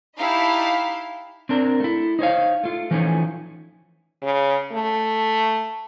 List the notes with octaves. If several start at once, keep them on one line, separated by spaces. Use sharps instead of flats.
D#4 E4 G4 F5 A5 B5
C4 D4 A#4
A3 E4
D#4 C5 C#5 F5
A3 F4
E3 F3 A3 C#4 D#4
C#3
A3